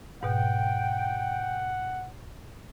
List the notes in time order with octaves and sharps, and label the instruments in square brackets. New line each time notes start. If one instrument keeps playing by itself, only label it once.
[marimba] G#2 B2 [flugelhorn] F#5 [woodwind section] G5